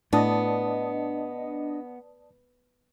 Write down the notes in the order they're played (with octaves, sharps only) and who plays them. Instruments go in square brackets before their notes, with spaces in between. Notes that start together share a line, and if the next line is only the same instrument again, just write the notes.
[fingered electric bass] A2 [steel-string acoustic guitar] B3 [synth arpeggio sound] D4 D#5 [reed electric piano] D5 A5 D#6